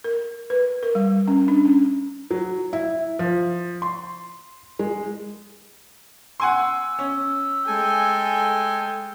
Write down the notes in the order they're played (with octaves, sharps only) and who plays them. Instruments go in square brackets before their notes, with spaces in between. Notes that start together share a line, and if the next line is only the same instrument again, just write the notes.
[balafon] A#4
B4
A#4
G3
C#4
D4
C#4
[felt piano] F#3
E4
F3
C6
G#3
[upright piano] F#5 G#5 C6 [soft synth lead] E6
[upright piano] C#4
[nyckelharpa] G#3 G5 [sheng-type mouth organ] A4 G#5